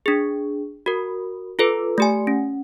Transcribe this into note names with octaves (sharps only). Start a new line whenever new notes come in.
D4 G#4
F#4 A#4
F4 A4 B4
A3 G4 G#5
C#4